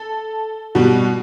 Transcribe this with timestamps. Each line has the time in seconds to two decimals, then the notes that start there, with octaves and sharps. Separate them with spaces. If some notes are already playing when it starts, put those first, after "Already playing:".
Already playing: A4
0.75 B2 G3 F#4